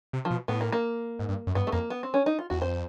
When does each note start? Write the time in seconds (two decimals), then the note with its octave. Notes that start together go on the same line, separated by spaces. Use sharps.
0.13 C3
0.25 F3
0.31 B2
0.48 A2 B3
0.61 A#3
0.72 A#3
1.19 G#2
1.29 G2
1.47 F#2
1.55 G2 B3
1.67 A3
1.72 F2 A#3
1.90 B3
2.03 C4
2.14 C#4
2.26 D#4
2.39 F4
2.50 E2 F#4
2.62 F2 C5